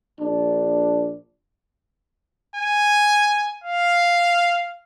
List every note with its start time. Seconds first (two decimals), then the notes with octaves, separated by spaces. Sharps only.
0.19 A#1 D4
2.55 G#5
3.64 F5